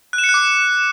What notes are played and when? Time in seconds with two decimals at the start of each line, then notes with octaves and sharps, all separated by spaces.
0.13 F#6
0.18 E7
0.24 C#7
0.29 F#6
0.34 D6